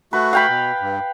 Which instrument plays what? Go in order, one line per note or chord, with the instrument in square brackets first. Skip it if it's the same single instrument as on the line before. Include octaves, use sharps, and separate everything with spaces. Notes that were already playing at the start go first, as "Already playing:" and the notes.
[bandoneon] A3 F#4 [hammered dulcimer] B4
[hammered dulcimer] F5 G5 B5
[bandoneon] B2
G2